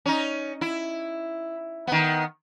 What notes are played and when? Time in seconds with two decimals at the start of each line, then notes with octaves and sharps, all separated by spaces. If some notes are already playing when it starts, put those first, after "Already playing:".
0.06 C#4 D#4
0.61 E4
1.87 D#3 B3